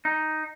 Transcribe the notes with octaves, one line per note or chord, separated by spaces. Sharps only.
D#4